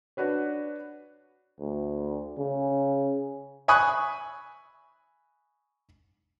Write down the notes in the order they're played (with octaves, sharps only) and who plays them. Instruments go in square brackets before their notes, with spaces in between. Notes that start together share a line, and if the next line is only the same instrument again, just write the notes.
[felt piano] D4 F#4 B4 C#5
[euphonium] D2
C#3
[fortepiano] E5 G#5 B5 C#6 D#6 F#6